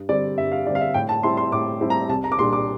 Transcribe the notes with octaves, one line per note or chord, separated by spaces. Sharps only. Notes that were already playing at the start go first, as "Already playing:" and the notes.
Already playing: G2
D3 G3 C4 D5
G2 E5
F5
D3 G3 C4 D5
F5
E5
A2 G5
A5
G3 C4 E4 C6
C6
A2 D6
G3 C4 E4
A#5
C2 A5
A#5
D6
A#2 G3 D4 C6
D6